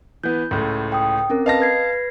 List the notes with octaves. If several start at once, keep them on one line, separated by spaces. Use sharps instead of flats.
E3 B3 G6
C#2 A2
G5 D#6
C4 C#4 A#4
B4 D#5 F5 A5 A#6
B4 G#6 C7